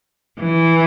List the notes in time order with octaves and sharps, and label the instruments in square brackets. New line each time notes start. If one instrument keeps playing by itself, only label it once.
[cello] E3